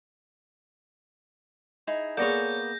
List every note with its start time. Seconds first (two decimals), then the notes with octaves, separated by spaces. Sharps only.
1.87 D#4 E4 G#4
2.17 A#3 B3 G#4 A4 C#5 D5 G6 A#6